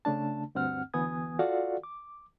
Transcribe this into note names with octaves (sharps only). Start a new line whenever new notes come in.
C#3 A3 D4 A5
D2 G2 C4 F#5 F6
D2 E3 B3 G#5 D#6 G#6
F4 F#4 A4 D5 F5 F#5
D6